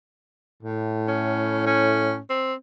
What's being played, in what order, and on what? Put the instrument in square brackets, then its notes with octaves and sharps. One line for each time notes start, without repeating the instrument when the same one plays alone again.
[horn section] A2
[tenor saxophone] C#4
C#4
C4